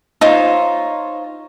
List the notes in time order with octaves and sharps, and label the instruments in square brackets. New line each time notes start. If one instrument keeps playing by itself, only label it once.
[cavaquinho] D#4 F4 C5 C#5